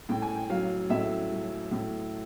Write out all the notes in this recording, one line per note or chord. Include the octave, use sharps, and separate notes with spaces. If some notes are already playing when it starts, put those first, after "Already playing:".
A2 G5
G#5
G5
F#3 F5
A2 E5
F#3
A2